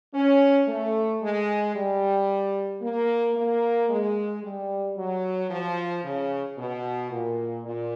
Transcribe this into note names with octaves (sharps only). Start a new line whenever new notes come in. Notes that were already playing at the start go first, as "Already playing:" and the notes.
C#4
A3
G#3
G3
A#3
A#3
G#3
G3
F#3
F3
C#3
B2
A#2
A#2